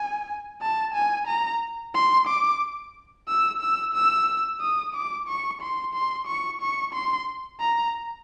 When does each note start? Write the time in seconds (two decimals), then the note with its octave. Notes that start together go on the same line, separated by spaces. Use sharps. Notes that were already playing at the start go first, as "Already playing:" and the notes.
Already playing: G#5
0.62 A5
0.94 G#5
1.27 A#5
1.95 C6
2.27 D6
3.28 E6
3.61 E6
3.94 E6
4.60 D#6
4.94 D6
5.28 C#6
5.61 C6
5.94 C6
6.27 C#6
6.61 C#6
6.93 C6
7.60 A#5